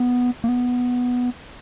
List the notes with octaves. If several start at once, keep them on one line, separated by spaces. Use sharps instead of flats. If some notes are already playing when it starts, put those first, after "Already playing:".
Already playing: B3
A#3
B3